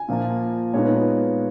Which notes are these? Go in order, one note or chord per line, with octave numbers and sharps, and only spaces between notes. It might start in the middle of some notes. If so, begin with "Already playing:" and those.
Already playing: G#5
A#2 F3 A#3
A#2 G#3 B3 D#4 C#5
B4
B4